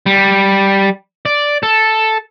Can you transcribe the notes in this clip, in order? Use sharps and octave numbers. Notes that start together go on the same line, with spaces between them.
G3
D5
A4